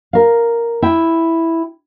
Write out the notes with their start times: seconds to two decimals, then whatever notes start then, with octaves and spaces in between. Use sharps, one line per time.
0.13 A#4 F5
0.82 E4 G5